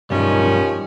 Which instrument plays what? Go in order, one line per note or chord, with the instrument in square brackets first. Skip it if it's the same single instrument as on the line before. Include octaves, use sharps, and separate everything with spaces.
[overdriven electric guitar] B1 G2 [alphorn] D#3 [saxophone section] F3 G3 C#4